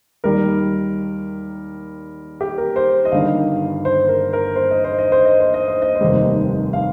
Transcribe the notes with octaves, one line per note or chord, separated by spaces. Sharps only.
D#2 D#3 G3 A#4
G4
A#4
C5
D#5
G1 G2 D#3 G3 F5
C5
A#4
A#4
C5
D#5
C5
D#5
C5
D#5
C5
D#5
C5
D#5
C5
F1 D#2 D#3 G3
F5